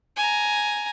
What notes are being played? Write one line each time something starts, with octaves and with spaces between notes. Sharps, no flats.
G#5 A#5